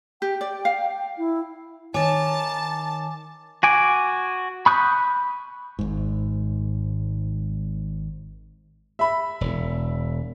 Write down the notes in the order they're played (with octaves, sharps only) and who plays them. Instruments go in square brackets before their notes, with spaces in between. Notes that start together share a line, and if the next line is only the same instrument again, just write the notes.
[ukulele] G4 [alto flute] G5
[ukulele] D5
F5
[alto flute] E4
[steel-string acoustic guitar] D#3 C#5 [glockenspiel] G#5 D6 [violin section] A5
[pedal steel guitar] F#4 G#5 D6
B5 C#6 D#6 F#6 G6
[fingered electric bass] G#1 G#2
[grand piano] E5 B5
[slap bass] E1